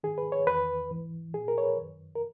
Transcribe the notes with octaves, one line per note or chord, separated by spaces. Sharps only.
G#2 D#3 G#4
B4
C#5
E2 D#3 B4
G#2 E3
A#2 G#4
A#4
C#5
B4
F#2 D#3
A#4